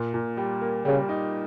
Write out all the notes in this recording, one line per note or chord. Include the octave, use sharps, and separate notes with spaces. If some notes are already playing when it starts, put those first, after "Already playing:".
Already playing: A#2
A#2
G3
A#3
C#3 G3
D#4